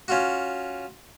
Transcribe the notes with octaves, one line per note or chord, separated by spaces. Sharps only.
C#4 F4 F#4